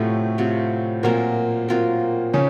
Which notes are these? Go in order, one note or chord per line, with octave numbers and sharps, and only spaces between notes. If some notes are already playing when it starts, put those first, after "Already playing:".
Already playing: A2 C3 F#3 A3 C4 F4
C3 F#3 C4 F4
A#2 F#3 A#3 C4 F4 A#4
F#3 C4 F4 A#4
C#3 C#4 D#4